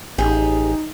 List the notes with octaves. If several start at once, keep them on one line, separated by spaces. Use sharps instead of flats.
A1 D#4 G4 G#4